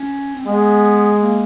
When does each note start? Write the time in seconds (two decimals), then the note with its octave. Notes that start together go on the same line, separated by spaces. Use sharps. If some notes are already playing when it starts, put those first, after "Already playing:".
Already playing: C#4
0.36 C4
0.46 G#3 B3
1.21 A#3